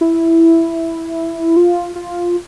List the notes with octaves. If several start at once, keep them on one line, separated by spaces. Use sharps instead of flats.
E4
F4
F4